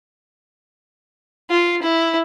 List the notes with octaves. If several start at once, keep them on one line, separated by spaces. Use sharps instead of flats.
F4
E4